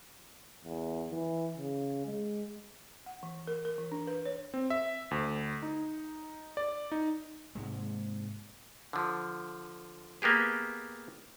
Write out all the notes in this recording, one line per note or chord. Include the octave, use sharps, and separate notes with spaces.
E2
E3
C#3
G#3
F#5
E3
A#4
A#4
E3
D4
B4
C#5
C4
E5
D2
D#4
D5
D#4
G#2 C3 G#3
D3 F3
A#3 B3 G4 G#4